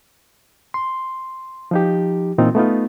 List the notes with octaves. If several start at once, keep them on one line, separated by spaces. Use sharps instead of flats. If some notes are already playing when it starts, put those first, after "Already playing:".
C6
F3 D#4 G4
A#2 E3 C4 D#4 F4
A3 B3 D#4 F4